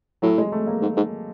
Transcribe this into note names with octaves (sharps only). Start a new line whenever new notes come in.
A2 F#3
G#3
A3
A#3
G#2
G#2